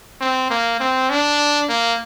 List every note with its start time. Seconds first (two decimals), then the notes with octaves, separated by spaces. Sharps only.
0.21 C4
0.50 A#3
0.80 C4
1.10 D4
1.69 A#3